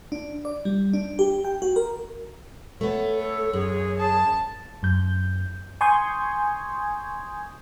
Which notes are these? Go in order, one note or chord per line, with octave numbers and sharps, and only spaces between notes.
D4
D5
G3
D4
G4
G5
F#4
A#4
A3 B3 C#5
A4
F#2 G#4
A5
F#2 G6
G#5 C6 C#6 D#6 G6 G#6